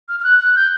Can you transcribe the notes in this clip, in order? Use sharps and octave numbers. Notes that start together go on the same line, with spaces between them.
F6
F6
F#6
F#6
G6